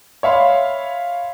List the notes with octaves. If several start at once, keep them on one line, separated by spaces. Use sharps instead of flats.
C#5 E5 F5 B5 C6